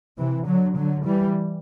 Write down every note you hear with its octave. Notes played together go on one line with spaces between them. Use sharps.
C3 E3
D3 F#3
D3 F#3
E3 G3